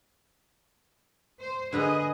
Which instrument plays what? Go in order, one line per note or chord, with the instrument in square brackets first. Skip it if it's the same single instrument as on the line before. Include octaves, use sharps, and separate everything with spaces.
[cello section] C5
[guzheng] D3 B4 A#5 [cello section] G#4 D#5